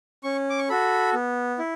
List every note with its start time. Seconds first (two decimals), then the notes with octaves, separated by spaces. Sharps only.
0.23 C#4 C#6
0.50 D6
0.59 C#6
0.70 F#4 A4 B5
1.14 B3
1.59 E4